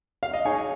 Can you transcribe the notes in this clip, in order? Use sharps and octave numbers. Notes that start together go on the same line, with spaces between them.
F5
D#5
D#4 G#4 C#5